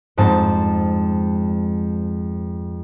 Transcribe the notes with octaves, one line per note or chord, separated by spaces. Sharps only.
F2 G#2 C4 A5